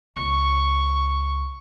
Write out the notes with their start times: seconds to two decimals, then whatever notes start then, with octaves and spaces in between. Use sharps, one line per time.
0.16 C#2 C#6